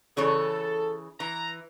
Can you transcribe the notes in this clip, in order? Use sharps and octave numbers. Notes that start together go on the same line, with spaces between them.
C#3 E3 A4 C#5
E3 A#5